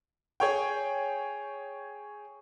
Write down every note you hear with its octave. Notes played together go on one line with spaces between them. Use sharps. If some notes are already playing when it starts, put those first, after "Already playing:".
G#4 C#5 G5